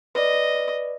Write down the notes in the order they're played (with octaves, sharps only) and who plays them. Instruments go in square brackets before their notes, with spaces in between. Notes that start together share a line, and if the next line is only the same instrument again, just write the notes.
[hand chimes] B4 D5 [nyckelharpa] D#5